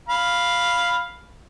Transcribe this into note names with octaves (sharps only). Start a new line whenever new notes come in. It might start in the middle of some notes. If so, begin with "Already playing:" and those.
F5 B5